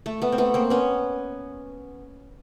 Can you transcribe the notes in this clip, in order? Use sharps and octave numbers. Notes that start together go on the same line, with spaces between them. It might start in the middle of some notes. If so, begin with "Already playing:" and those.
A3
A3 B3
C4
A3 B3
A#3 C4
B3 C#4